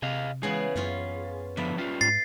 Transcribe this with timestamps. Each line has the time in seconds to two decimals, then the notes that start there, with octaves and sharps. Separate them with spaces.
0.02 C3 G#4 D#5 F5
0.43 C#3 E3 G#3 B3 G#4
0.76 F#2 B3 C#4 F4
1.57 D3 F3 B3 E5
1.78 G3 C#4 F4
2.01 G#2 A6 C7